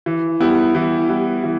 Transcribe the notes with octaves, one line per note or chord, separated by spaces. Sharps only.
E3
G3 B3 E4
E3
G3 B3 E4
E3